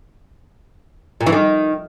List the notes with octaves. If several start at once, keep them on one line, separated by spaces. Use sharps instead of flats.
A#2
E3
D#3